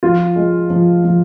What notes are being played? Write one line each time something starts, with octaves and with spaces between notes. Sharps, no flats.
F3 F4
G#3
F3
F3